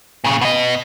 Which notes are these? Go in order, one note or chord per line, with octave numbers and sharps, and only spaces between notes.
A#2 C#3
B2 D#5